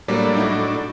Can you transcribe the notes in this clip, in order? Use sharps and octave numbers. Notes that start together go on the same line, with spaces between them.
A2 F#3 G3 A#3 D4
D#4 E4 F#4